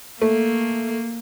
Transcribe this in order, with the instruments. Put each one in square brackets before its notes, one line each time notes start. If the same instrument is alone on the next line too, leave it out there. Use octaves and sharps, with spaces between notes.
[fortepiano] A3 [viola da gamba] A#3